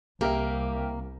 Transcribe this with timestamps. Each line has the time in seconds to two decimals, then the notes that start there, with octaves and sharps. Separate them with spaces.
0.21 C2 A#3 G4 A#4 E5